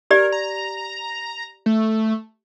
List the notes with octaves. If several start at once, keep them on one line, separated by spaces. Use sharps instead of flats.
G4 A#4 D5
A#5
A3